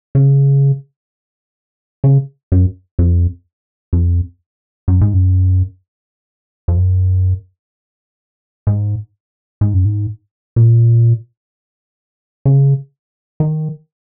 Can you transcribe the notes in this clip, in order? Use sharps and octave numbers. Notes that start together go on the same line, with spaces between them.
C#3
C#3
F#2
F2
F2
F#2
G#2
F#2
F2
F#2
G#2
G#2
F#2
G#2
A#2
C#3
D#3